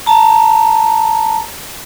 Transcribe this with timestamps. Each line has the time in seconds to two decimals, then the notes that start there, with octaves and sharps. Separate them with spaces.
0.06 A5 A#5